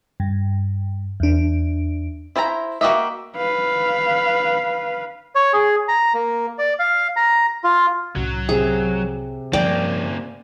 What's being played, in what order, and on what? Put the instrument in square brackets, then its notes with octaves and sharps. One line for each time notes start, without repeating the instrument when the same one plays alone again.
[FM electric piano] G2
E2 D4
[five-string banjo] E4 C5 E5 G#5 A#5
A#3 F#4 G4 D#5 E5
[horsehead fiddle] B4 F5
[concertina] C#5
G#4
A#5
A#3
D5
F5
A#5
F4
[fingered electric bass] C2 A2 C#4 [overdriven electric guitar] F#3
[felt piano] C3 [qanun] G#4
[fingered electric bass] G2 F3 [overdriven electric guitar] A#3 C#4 [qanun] D5 G5